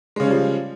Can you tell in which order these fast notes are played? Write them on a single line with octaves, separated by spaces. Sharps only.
G#3 C#3 C#4 G3 F3